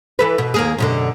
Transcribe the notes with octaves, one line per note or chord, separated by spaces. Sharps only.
E3 A4 B4
B2
D#2 A#3 G#4
F#2 B2 D3